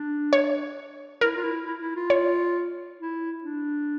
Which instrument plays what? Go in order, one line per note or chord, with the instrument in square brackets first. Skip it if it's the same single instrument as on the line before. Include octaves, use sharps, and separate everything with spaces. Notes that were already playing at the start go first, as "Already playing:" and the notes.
Already playing: [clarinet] D4
[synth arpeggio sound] C#5
[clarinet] E4 [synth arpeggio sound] A#4
[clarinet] F4
E4
E4
E4
F4
[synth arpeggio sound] C#5
[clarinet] E4
D4